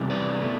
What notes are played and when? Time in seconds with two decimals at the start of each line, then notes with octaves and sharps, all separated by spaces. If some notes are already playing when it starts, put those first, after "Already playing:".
Already playing: E2 C3 E3 G3
0.10 B4 D5
0.41 B2 A3